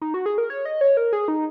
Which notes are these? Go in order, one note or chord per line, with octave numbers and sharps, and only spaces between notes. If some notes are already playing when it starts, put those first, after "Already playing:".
D#4
F#4
G#4
A#4
C#5
D#5
C#5
A#4
G#4
D#4